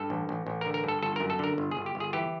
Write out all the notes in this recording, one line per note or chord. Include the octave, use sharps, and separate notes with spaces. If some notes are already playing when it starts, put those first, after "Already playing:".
Already playing: G2 A4
A1
A1
A1
A#4
D3
A#4
G2 A4
G1 A4
F#2 A#4
A4
D3 A#4
G1
G#4
G1
G4
G1
G#4
E3 G4